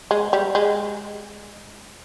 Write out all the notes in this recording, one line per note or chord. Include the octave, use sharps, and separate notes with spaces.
G#3
G3
G#3